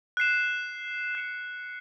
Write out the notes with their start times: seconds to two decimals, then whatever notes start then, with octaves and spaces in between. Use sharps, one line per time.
0.17 F#6 C7 E7
1.15 F#6 C#7 E7